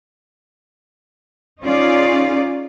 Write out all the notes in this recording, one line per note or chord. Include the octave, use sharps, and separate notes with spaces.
C#4 D#4 F4 G#4 D5